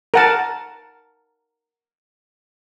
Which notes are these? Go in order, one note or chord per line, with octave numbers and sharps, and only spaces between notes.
A#4 F#5 A5